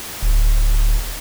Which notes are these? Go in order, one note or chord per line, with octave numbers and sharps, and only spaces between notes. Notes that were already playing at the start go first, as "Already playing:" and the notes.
D1